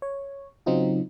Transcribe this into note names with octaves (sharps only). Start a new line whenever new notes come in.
C#5
C#3 F#3 C4 D#4 F4